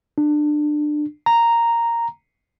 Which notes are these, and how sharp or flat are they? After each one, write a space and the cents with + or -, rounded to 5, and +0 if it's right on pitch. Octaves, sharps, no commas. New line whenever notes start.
D4 +25
A#5 -5